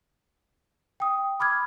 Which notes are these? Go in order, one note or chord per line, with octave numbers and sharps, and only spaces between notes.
G5 D#6
B5 D6 F6 G#6